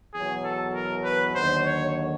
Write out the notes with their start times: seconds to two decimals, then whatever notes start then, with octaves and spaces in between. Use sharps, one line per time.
0.13 E2 B2 F#3 G#4
0.44 A4
0.74 A#4
1.04 B4
1.35 D#2 D3 F#3 C5
1.66 C#5